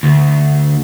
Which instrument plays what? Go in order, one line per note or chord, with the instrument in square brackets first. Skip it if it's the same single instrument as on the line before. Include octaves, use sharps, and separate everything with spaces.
[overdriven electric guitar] D2